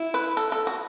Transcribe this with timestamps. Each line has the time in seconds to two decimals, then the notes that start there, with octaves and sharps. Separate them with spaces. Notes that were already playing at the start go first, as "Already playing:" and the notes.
Already playing: E4
0.14 B4
0.37 A4
0.52 A4
0.67 F#4